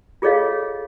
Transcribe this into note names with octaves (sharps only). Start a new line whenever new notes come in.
F4 G#4 A4 C#5 D#5 F5